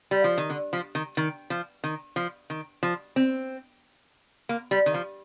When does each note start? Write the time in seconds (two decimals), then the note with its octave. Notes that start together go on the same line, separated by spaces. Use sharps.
0.11 G3
0.24 F3
0.37 D#3
0.50 D3
0.73 F3
0.95 D#3
1.17 D#3
1.50 F3
1.84 D#3
2.16 F3
2.50 D#3
2.83 F3
3.16 C4
4.49 A#3
4.71 G3
4.86 D#3
4.94 F3